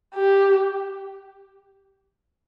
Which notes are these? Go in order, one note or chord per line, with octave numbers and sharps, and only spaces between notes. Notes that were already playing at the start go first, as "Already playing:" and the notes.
G4